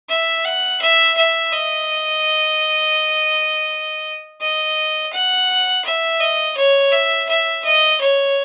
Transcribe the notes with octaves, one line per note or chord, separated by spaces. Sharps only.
E5
F#5
E5
E5
D#5
D#5
F#5
E5
D#5
C#5
E5
E5
D#5
C#5